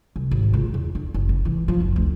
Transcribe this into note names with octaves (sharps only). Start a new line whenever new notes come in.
C2
G#1
C#2
E2
D3
F#1
C#3
E3
F3
F#1
D2